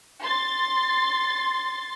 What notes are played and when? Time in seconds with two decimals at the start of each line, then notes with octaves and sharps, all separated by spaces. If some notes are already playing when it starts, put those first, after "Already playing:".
0.23 C6 A6